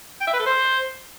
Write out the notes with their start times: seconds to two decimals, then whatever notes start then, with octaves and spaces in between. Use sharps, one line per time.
0.21 G5
0.27 E5
0.33 B4
0.39 A4
0.46 C5